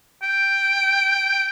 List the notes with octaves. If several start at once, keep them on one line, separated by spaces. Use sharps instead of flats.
G5